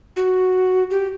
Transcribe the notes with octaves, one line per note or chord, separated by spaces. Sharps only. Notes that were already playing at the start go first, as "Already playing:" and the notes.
F#4
G4